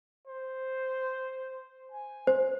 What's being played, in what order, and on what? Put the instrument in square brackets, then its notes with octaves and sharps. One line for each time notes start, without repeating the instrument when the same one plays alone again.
[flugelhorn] C5
G#5
[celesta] C5